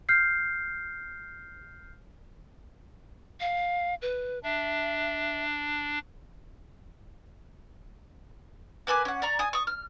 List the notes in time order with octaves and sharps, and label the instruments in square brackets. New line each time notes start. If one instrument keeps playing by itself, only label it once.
[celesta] F6 G6 C7
[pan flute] F5
B4
[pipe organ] D4 [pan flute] E5
[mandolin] A#3 B4 G#5 D6
C#4 F#5
D5 A#5 C#6
G#5 D#6
C#6 D#6
F6